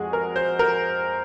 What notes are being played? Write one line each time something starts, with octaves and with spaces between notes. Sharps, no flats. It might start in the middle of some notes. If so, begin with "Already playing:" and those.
Already playing: F2 G#3 F#4 G#4
A#4
C5
A#4